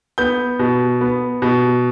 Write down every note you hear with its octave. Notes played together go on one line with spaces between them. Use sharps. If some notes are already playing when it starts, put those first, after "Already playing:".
B3 G6
B2
B3
B2